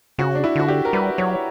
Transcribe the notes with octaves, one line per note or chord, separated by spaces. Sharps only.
C#3 F#4
D4
E4
D3 F#4
G4
A#4
G3 B4
F#3 C#5